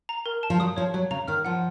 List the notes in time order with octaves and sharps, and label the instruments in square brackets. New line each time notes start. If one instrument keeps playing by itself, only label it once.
[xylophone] A#5
A#4
A5
[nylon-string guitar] F3
[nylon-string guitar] F#3 [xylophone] D#6
[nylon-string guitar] F3 [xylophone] C#5
[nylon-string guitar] F#3 [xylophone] C#5
[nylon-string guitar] C#3 [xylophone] A#5
[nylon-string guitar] D#3 [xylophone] F6
[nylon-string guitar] F3 [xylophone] F#5